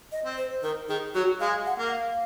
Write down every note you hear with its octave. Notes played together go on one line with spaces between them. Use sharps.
D#5
C4
C5
D#3 A#4
D#3 G#4
F#3 F#4
G#3 F5
F#5
A#3
F5